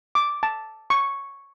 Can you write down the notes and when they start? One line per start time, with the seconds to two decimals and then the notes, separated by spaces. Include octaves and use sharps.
0.15 D6
0.43 A5
0.90 C#6